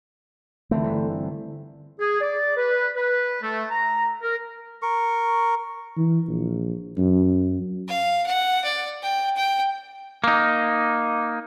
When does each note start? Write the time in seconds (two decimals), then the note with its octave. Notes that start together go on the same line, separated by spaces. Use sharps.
0.71 D3 E3 A3 C4
0.84 G1 E5
1.99 G#4
2.21 D5
2.57 B4
2.95 B4
3.42 A3
3.70 A#5
4.23 A#4
4.82 A#4 C#6
5.97 E3
6.28 A#1
6.98 F#2
7.88 F5
8.26 F#5
8.64 D5
9.02 G5
9.36 G5
10.24 A#3 D#4